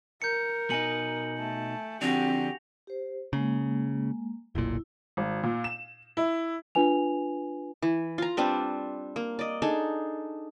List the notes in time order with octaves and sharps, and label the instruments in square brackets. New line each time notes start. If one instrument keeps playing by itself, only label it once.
[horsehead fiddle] A#4 [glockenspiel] G6 C#7
[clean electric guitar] B2 D#4 [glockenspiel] G#5 C#7 F#7
[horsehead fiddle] A3 A5
[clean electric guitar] D3 F3 D4 [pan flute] C4 [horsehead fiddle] F#4 G4 [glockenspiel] A#6 F7
[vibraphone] G4 C5
[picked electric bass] C#3 [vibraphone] G#3 A#3
[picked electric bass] F1 B1 A#2 [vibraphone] E4
[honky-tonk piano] G#1
A#2
E7
E4
[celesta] D4 F4 B4 G#5 F7
[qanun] E3
F4 A#5
G3 C4 D4 B4
A#3
D5 D#5
D4 D#4 G#4 A4